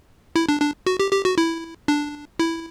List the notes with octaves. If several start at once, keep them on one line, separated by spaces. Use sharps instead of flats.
E4
D4
D4
F#4
G4
G4
F#4
E4
D4
E4